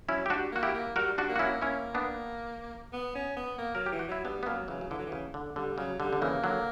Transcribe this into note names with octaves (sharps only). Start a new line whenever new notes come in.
F#3 C#4 E4
G4
G3 D4 F#4
A#3 F#4
E4 G4
A#3
G3 F#4 A#4
D4 F#4
A#3
F#4
C#4 E4
A#3 C#4 E4
B3 D4
B3
C#4
B3
A#3
F#3 A#4
G4
E3
F#4
F#3 E4
G3 B3 D4
B3
F#3 A#3 C#4
C#3 E3 F#3
C#3
D3 E3
F#3
E3
C#3
D3
D3 G3
C#3 F#3
D3 G3
D3
C#3 E3 A#3
D3 F#3